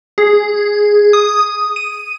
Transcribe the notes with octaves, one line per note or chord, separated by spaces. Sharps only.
G#4
D#6
D#7